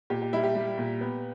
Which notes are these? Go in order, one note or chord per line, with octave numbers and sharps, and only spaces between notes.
A#2 G4
G4
G3 E4
G4
G3
A#2
B3